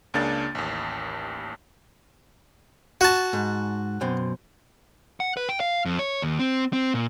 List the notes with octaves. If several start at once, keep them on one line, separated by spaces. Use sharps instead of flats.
C#2 C#3 A#3 D4 A6
A1 D#2
F#4 A5
G#2
F#2 B2 C4
F#5
B4
G5
F5
F2
C#5
D#2
C4
C4
A#2